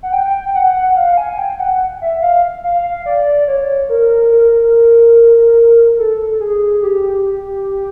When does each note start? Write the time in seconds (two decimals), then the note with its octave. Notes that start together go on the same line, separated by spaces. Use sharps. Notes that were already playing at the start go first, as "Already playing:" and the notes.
0.03 F#5
0.13 G5
0.55 F#5
0.97 F5
1.17 G#5
1.38 G5
1.60 F#5
2.01 E5
2.22 F5
2.64 F5
3.06 D5
3.48 C#5
3.89 A#4
4.32 A#4
5.99 A4
6.40 G#4
6.82 G4